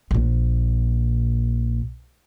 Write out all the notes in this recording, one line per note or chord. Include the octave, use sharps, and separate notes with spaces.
A#1 A#2